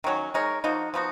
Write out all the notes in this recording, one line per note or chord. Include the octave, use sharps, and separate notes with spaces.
D#3 F#3 C#4
G#3 D#4 A#4 C#5
F3 A#3 D#4 F#4
F3 B3 D#4 F#4